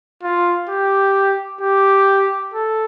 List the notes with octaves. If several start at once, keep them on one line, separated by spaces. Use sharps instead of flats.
F4
G4
G4
A4